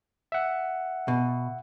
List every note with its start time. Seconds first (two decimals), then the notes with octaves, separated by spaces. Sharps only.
0.32 E5 F#5
1.08 B2